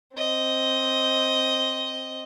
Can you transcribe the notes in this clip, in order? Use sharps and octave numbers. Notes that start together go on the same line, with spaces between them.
C4 D#5